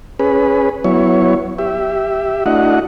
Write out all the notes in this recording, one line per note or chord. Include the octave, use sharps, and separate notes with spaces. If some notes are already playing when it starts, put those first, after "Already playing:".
C#4 G#4 B4
F#3 B3 E4 C#5
G4 E5
A3 D4 E4 F#4 D#5 F#5